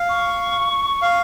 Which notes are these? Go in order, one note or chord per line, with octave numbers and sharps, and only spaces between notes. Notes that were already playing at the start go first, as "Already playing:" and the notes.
Already playing: F5
C#6
F5